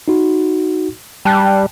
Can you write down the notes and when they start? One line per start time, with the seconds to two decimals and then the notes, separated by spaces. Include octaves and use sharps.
0.08 D#4 F#4
1.25 G3 G5 A5 F#6